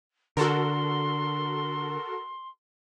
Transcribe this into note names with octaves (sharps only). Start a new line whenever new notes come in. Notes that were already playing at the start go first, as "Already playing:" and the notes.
D3 F#4 A4 A#4 C6